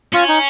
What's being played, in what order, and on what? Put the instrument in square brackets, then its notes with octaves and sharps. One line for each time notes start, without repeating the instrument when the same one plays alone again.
[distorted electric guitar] C#4 [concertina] F4
[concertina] D#4